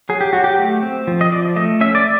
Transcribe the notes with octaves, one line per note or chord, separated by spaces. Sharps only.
F#3 G#4
G4
F#3 F#4
G4
A3
C4
F3
D#5
F3 D5
A3 D#5
C#4 E5
D5